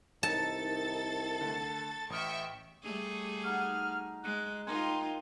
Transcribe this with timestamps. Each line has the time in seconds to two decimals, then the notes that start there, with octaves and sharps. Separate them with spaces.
0.23 C2 D#3 D#4 A4 A5 E6 A6 C#7
1.41 D3 A3
2.10 A1 E5 G5 C#6 D#6 F6
2.83 G3 A3 G#4
3.44 D#4 F#4 F6
4.24 G#3 F#6
4.67 D#4 F4 A#4 G5 G#5 C6